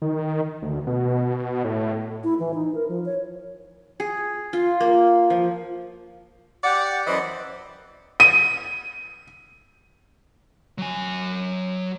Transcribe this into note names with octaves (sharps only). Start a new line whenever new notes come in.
D#3
D2
B2
A2
E4
E3
D#4
A#4
F3
C#5
G#4
F4
A#3
F3
G4 D5 F#5
F#2 E3 C5 D5 D#5
D#7
F#3 G#5